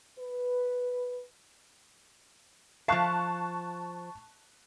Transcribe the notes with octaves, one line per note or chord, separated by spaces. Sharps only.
B4
F3 F5 A5 C#6 F#6